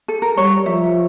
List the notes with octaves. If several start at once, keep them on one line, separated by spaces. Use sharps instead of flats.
A4
A#4
G3 C#5
F3 E5